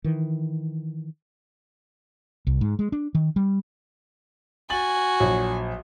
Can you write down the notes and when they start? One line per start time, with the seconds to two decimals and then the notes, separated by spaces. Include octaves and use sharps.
0.04 D#3 E3
2.47 C2
2.61 G#2
2.79 G#3
2.92 D4
3.15 D#3
3.36 G3
4.70 F#4 G#5 A6 F#7
5.20 A#1 F#3